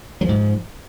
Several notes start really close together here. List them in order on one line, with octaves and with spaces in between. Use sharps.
F#3 F3 G#2